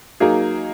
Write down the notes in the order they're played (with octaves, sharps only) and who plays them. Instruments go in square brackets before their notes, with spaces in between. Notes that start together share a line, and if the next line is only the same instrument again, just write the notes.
[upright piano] F#3 A#3 D#4 G#4